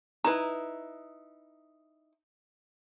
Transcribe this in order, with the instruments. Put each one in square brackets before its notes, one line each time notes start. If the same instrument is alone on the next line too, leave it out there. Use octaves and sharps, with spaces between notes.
[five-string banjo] D#4 E4 B4 [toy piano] A#5